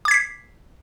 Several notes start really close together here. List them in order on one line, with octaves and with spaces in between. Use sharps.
D6 G#6 B6 C7